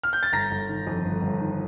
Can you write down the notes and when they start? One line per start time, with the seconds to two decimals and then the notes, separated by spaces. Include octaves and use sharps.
0.03 F6
0.13 G6
0.23 A6
0.32 G1 A#5 A#6
0.51 G1
0.69 D#3
0.87 F2
1.04 G1
1.22 G1
1.40 D#3